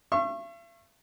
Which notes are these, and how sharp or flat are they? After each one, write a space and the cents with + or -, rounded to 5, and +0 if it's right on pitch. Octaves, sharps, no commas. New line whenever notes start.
E5 +45 C#6 -25